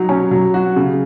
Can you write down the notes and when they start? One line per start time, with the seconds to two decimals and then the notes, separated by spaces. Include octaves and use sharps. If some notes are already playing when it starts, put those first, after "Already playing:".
Already playing: F#3 D#4
0.09 C#4
0.31 F#3
0.54 F#4
0.76 C#3